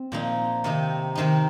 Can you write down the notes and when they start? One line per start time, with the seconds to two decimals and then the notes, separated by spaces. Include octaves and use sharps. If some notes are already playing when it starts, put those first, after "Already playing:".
Already playing: C4
0.12 A#2 F3 A#3 D#4
0.64 C3 D#3 C4 D#4
1.15 C3 D#3 C4 D#4